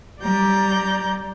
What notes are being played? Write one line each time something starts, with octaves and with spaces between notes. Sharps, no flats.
G3 D5 A#5 G6